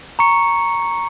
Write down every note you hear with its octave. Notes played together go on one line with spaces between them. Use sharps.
A#5 C#6 C#7